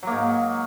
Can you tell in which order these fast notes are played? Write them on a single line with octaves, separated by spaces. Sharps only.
F#3 A#3 G#2